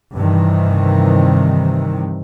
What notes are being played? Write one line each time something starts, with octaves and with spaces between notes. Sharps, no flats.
G2 C3 D#3 E3